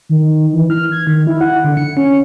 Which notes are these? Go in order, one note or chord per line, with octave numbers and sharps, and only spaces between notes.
D#3
E3
F6
G#6
D#3
E4
F#5
D3
C#7
C#4